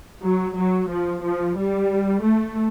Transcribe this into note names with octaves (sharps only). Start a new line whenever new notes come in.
F#3
F#3
F3
F3
G3
A3